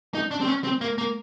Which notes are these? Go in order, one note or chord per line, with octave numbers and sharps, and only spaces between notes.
D#4
D4
C4
C#4
C4
A#3
A#3